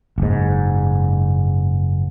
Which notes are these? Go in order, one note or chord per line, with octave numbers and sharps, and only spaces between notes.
F#1 G#2